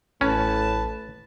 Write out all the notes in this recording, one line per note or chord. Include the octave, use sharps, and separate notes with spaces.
A1 A2 C#4 B4 A5